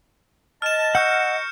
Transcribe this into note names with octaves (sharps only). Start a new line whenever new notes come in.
D#5 A5 F6 E7
A#4 F#5 C#6 E6 F#6 G6 C#7